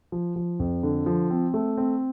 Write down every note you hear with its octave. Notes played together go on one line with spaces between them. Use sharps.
F3
F3
F2
D3
F3
C4
A3
C4